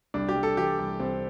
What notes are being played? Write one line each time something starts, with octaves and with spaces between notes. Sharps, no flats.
C2 D4
G4
C2
A4
E3 G4
C2
C2 C4